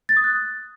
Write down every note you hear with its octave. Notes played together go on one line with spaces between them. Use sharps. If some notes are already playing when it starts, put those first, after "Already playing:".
A6
D#6
F#6